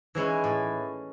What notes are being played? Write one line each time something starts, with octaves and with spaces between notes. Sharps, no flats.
E3 G#3 C#4 E4
A2